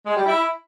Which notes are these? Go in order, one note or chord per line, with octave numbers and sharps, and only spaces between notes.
G#3
G3
E4